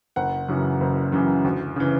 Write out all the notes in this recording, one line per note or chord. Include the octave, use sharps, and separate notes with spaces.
F#1 F#5
F#2 C#3 E3
F#1
F#2 C#3 E3
D2
C#3 E3